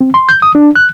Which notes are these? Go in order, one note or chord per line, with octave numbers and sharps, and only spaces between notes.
C4
C6
G6
D#6
D4
F#6